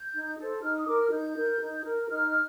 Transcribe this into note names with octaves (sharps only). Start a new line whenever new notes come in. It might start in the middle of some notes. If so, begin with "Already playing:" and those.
Already playing: G6
D#4
A4 C5
D#4 F6
D#6
A#4 D6
F6
D#4 G6
A#4
D#4
A#4
D#4 F6